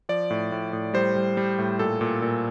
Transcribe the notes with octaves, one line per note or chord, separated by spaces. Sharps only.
F3 D5
A2
A2
A2
G3 C5
G3
G3
A2
A#2 A4
A#2
A#2